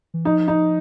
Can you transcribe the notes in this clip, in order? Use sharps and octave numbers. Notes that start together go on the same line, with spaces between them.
E3
F3 D#4
D#4